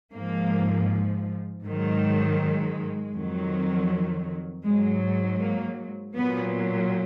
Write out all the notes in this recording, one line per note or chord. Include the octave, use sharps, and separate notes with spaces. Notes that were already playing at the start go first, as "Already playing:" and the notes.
G#2 F3 A#3
G#2 D#3 F#3
G#3
F2 D#3 F#3
G#2 F#3 G#3
A#3
A#2 F#3 B3